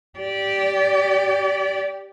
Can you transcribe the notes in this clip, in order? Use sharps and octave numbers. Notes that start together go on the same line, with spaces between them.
G4 D5